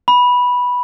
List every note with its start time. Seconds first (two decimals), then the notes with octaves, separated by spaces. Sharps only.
0.08 B5